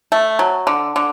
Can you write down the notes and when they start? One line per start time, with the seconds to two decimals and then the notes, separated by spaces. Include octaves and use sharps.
0.12 A3
0.39 F#3
0.67 D3
0.96 D3